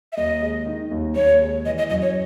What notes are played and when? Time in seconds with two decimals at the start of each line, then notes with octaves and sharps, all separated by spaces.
0.12 E5
0.17 D#2 D#5
0.41 G#3
0.66 D#3
0.91 D#2
1.15 D#2 C#5
1.41 G#3
1.66 E3 D#5
1.78 D#5
1.90 F#2 D#5
2.02 C#5